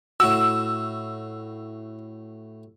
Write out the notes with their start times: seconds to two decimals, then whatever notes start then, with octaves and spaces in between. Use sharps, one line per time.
0.20 A2 F#4 E6